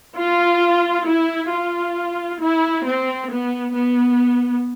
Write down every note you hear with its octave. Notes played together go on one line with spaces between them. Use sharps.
F4
E4
F4
E4
C4
B3
B3